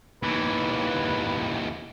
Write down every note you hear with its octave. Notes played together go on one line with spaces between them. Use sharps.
D#2 E3 B4